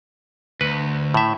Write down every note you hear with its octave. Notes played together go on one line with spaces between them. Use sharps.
D2 B4
A2 E5